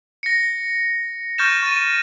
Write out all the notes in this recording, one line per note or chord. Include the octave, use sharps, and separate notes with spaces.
A#6 C#7
C#6 F6 G6 A6 A#6 E7
C#6 A6 D#7